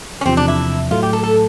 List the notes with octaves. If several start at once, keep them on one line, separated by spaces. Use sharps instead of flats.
C#4
E2 C3 F3 C4
D4
E4
A2 F#3 A3 F4
G4
A4
A4